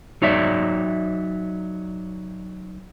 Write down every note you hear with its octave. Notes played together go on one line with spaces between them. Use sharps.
F#3 D#4 C#5 D5 E5